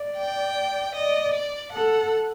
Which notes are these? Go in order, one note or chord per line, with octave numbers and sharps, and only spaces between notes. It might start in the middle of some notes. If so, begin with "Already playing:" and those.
Already playing: D5
G5
D5 D#5
D5
A4 F#5